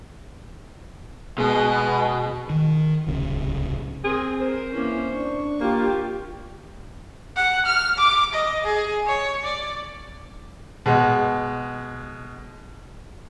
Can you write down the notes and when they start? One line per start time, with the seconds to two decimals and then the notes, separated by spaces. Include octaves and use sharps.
1.38 B2 G#3
2.50 D#3
3.07 D1 C2 C#3
4.04 C4 G#4 A#4
4.41 A#4 C5
4.73 E3 A#3 C#4
5.13 D4 C#6
5.61 A#3 F4 G4
7.36 F#5
7.66 F6
7.98 D6
8.33 D#5
8.64 G#4
9.07 C#5
9.44 D5
10.86 B2 G#3